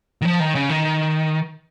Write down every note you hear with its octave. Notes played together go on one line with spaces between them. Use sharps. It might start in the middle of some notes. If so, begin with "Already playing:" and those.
D#3
F3
D#3
C#3
D#3